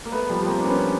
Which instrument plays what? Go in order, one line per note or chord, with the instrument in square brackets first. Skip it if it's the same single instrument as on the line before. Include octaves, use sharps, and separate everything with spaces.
[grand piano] A#3
A3 B3
F3 G3
A#3 C4
D4
B3 C#4